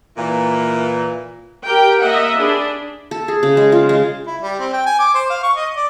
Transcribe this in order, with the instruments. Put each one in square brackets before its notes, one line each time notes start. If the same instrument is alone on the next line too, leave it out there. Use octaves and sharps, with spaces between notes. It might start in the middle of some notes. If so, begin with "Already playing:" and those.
[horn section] A#2 E3
[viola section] G4 A#4 G5
A#3 D#5 E5 F#5
D4 G#4 B5
[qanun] A4
G#4
C#3
G#3
F4
G#3
[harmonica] E4
G3
C4
G5
G#5
D6
C5
F5
C#6
D#5
D5